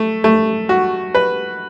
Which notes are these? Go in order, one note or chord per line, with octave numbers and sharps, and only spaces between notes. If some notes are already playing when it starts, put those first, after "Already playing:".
Already playing: A3
A3
F#4
B4